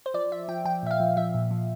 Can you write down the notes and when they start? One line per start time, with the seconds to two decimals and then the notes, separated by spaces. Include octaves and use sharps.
0.06 C5
0.14 F3 D5
0.31 F3 E5
0.48 F3 G5
0.65 F3 G5
0.83 A#2 E5
0.91 F5
1.00 F3
1.17 F3 E5
1.34 A#2
1.51 F3